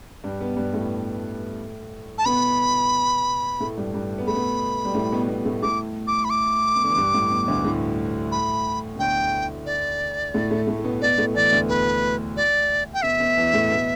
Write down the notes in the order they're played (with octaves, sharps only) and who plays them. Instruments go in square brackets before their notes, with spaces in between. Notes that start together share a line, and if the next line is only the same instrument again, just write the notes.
[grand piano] G2 G3
B2 B3
G2 G3
A2 A3
[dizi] A5
[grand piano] B2 B3 [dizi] B5
[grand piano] A2 A3
G2 G3
G2 G3
B3
[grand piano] A3 [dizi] B5
[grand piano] B2 B3
G3
A2 A3
B2 B3
B2 B3
A2 A3
[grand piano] A2 A3 [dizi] D6
[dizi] D6
B5
D6
[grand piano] B2
D3
E3
G2 G3
A2
B2
D2 D3
A2 A3
[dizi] B5
[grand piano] B2
[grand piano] D2 D3 [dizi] G5
[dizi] D5
[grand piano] A2 A3
A2 A3
A2 A3
A3
B2 B3
[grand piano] B2 B3 [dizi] D5
[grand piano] A2 A3
[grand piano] E2 E3 [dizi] D5
[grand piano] D2 D3
[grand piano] B2 [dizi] B4
[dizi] D5
G5
[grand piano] B2 [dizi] E5
[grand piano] B2
E2 E3
A2 A3
B2 B3